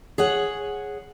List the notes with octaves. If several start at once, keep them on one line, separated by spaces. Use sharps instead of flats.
G#4 C#5 F#5